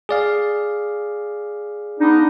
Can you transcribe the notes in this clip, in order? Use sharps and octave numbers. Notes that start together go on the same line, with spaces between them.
G#4 D5 F5
B3 D4 D#4